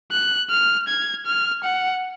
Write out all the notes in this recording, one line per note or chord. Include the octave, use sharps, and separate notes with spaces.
F#6
F6
G#6
F6
F#5